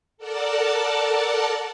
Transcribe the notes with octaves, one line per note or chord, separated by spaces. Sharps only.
A4 A#4 D5 F#5 A5